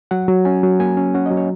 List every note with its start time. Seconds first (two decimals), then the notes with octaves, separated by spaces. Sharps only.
0.11 F#3 F#5
0.28 F#3
0.45 C#4 G#5
0.63 F#3
0.80 A#3 G#5
0.97 C#4
1.14 C#4 F#5
1.26 D#5
1.31 F#3
1.37 C#5